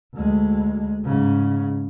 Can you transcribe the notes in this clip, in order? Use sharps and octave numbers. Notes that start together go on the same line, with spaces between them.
D2 G#3
G#2 C#3